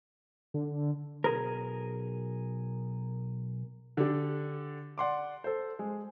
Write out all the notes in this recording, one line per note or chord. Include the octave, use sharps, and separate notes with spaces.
D3
B1 G#4 A#4
D3 D4 G4
D5 F#5 C6 D6
A4 C5
G#3